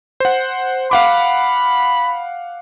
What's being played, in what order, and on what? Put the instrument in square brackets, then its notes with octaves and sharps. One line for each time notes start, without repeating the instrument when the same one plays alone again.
[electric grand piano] C5 F#5
[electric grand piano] F5 F#5 D6 [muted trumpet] B5